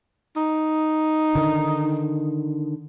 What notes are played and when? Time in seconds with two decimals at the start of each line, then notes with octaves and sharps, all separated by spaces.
0.36 D#4
1.35 D3 D#3